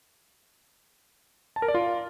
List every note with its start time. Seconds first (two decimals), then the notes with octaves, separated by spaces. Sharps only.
1.56 A5
1.62 A#4
1.68 D5
1.75 F4